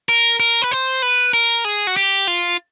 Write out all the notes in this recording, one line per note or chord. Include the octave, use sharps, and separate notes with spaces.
A#4
A#4
B4
C5
B4
A#4
G#4
F#4
G4
F4